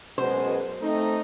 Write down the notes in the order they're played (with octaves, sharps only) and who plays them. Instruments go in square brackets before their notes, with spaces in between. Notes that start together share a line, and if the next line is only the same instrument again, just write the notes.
[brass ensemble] F#2 B2 G#3 [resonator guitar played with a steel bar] C5
[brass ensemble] A3 C4 D#4